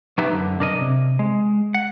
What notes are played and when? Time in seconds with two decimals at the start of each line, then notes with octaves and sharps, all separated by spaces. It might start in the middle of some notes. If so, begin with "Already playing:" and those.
0.18 F3 B3 D#4 G4 B4 E5
0.32 F#2 D3
0.59 B1 D4 A#4 D#5
0.81 C3
1.19 G#3
1.74 F#5